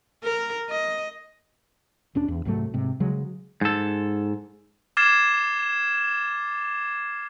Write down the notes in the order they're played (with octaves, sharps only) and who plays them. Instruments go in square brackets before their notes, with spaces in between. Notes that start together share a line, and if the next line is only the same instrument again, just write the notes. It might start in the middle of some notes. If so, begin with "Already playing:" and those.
[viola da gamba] A#4
D#5
[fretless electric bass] E1 C#4 D4
E2
C2 G#2 F#3 A3
G#2 C3
C#3 F#3 G#3
[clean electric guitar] G#2 A4
[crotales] D6 F6 G#6 A6 C7 E7